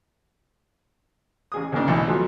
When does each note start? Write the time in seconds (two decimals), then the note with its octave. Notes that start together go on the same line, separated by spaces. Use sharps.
1.52 A1 G#4 D#6
1.72 D2 G#2 C#3 A#3 D4 D#4
1.88 B1 E3
2.07 F3 F#3 A3 B3 F4